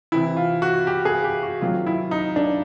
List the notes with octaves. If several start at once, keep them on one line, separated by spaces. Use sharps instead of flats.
C3 E3 E4
F4
F#4
G4
G#4
G4
F#4
C3 D#3 F#3 F4
E4
D#4
D4